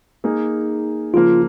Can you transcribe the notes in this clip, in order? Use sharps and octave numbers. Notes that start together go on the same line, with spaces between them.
A#3 D#4 G#4
C#3 F3 A#3 F4